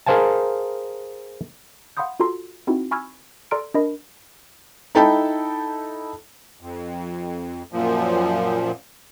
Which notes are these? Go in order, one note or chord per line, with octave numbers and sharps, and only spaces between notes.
G#4 A#4 C5 F5 G#5 A5
F5 F#5 B5 C6 D#6 G6
F4 F#4 A4 A#5 C6
C4 D#4 E4 F#4
G#5 B5 C#6 E6 F6 G#6
A4 D5 A#5 C6 F6 D7
D4 A#4 D#5 B5
D#4 E4 A4 G5 A5 B5
F2
F#2 A#2 F3